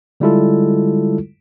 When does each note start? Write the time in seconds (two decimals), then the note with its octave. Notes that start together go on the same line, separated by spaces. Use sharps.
0.20 D3 G3 G#3 E4 F4 A4